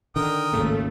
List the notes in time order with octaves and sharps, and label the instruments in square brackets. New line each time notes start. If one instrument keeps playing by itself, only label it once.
[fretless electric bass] D3 D#3 [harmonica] A#4 G5 D#6
[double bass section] G#1 D#2 [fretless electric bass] C#3 [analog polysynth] A3